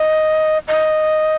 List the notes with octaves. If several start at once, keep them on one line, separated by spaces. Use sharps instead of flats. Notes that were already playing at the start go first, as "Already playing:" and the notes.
Already playing: D#5
D#5